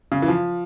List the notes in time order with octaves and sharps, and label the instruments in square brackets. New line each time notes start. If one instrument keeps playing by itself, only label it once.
[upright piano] C#3
E3
F3